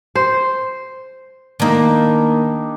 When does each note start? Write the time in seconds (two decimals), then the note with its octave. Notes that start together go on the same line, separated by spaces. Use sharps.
0.15 C5
1.60 D#3 A#3 D4 D#4 G4